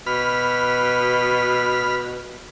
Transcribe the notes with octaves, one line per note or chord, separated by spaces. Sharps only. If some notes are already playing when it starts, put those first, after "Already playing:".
B2 B5 F6